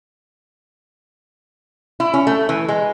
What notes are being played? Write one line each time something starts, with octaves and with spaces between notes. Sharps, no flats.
E4
C#4
A3
E3
G#3